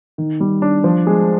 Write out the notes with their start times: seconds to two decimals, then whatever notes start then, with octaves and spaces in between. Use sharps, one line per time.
0.18 D#3
0.40 G3
0.62 D4
0.84 F3
1.07 G#3